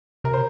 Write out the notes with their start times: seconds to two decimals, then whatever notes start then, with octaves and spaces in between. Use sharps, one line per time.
0.24 C3 A#4
0.33 C5